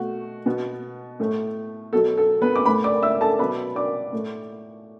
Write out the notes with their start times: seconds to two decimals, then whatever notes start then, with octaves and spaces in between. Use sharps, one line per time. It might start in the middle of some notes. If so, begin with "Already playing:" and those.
Already playing: B2 A3 F#4
0.46 B2 B3
1.20 A2 A3
1.93 B2 F#3 B3 A4
2.17 A4
2.42 B3 B4
2.56 D6
2.66 A2 B4 B5
2.69 A3
2.84 D5 D6
3.03 E5 E6
3.21 A4 A5
3.39 B2 F#3 B3 B4 B5
3.76 D5 D6
4.13 A2 A3